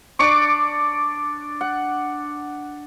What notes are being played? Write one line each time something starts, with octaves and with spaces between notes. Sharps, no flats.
D4 D5 C#6 D6
F#5